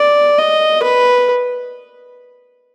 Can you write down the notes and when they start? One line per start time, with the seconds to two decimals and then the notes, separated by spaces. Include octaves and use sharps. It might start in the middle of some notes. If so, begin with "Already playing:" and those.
Already playing: D5
0.38 D#5
0.83 B4